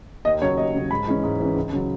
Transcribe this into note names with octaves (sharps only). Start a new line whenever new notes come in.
D#2 D#5
C#3 F#3 C#5
D#2 D#5
C#3 F#3
G#2 B5
E3 G#3 C#4
G#2
E3 G#3 C#4
C#2
C#3 F#3